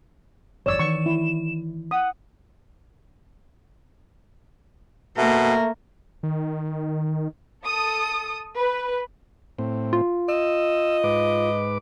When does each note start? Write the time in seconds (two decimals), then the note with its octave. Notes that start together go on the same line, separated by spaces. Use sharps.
0.66 G1 F2 C#5 D5 E6 E7
0.79 D#3 E3 C#6
1.06 E4
1.91 F#5 D#6
5.18 B2 A3 A#3 A#4
6.23 D#3
7.66 A4 D#6
8.57 B4
9.59 A2 C4
9.93 F4
10.29 D#5 E6
11.04 G#2 B4 D6